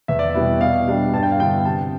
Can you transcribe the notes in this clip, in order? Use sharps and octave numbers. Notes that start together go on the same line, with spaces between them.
E2 E5
D5
E5
B2 G3 B3 E4
B2 F5
G3 D4
G2 A5
G5
F5
D3 G3 B3 E4 G5
C3 A5